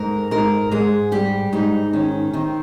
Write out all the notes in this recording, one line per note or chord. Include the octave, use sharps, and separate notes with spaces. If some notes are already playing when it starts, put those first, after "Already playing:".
Already playing: G#2 A#4
G#2 A#4
G#2 G#4
G3 G4
G#2 D#4
D#3 C#4
D#3 C4